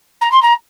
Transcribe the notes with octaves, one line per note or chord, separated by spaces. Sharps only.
A#5
C6
A#5